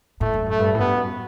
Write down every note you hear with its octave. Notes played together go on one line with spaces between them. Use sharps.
A2 A3
G2
F#2 A3
G2
A2
G2 B3
F#2